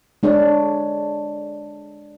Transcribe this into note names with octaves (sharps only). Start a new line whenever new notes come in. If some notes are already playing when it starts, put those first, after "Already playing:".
G#3 D4 G#4 C#5 D5